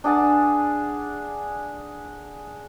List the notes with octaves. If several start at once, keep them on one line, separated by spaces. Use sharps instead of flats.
D4 G#4 F#5 A5